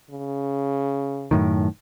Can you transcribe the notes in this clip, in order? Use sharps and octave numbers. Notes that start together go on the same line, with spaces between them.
C#3
F#2 A2 D#3